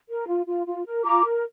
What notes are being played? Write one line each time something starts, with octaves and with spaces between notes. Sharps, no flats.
A#4
F4
F4
F4
A#4
F4 A#5 D6
A#4